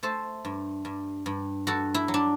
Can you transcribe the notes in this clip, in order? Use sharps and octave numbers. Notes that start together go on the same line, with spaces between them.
A3 A4 C5
G2
G2
G2
G2 F#4 A4
E4
F#3
D4